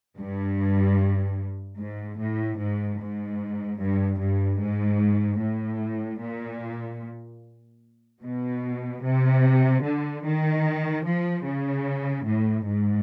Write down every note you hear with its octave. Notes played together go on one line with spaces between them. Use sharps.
G2
G#2
A2
G#2
G#2
G2
G2
G#2
A2
A#2
B2
C3
D3
D#3
F3
C#3
A2
G#2